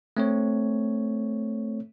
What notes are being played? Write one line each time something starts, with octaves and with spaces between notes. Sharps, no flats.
A3 C4 C#5